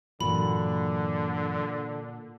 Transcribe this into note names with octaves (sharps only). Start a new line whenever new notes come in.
G2 A#2 D3 E3 F#3 A#3 F#4 B5